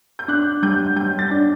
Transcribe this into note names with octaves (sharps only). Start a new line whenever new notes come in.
G6
D4 F#6
G3 G6
G3 G6
A6
D4